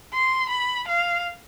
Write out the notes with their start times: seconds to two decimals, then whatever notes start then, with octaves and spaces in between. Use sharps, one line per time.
0.13 C6
0.49 B5
0.88 F5